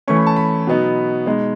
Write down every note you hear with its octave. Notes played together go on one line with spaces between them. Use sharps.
E3 A3 C#4 C#6
B5
A5
B5
B2 F#3 B3 D#4
B2 G#3 D#4